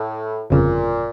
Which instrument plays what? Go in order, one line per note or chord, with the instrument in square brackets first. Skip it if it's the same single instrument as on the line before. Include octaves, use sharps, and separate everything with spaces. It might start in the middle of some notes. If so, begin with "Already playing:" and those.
Already playing: [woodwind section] A2
[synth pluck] G1 F2 C#3 [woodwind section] A#2